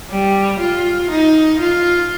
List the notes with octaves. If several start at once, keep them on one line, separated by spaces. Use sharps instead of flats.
G3
F4
D#4
F4